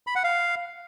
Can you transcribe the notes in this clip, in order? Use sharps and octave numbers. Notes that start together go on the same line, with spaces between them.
B5
F#5
F5